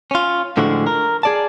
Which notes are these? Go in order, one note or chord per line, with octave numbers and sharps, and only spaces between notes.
C#4 F4
A2 D3 F3 G#3 F#4
A#4
G#4 D5 A5